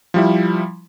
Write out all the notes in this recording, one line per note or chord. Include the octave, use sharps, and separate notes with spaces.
F3 G3 E4